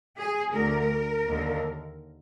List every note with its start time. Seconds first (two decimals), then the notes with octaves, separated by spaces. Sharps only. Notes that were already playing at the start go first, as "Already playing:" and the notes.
0.15 G#4
0.53 D2 D3 A#4
1.26 D#2 D3